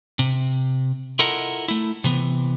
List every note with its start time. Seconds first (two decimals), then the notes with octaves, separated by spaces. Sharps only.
0.19 C3
1.19 E4 F4 A4 A#4 D#5 F#5
1.68 A3 E4
2.04 C3 E3 B3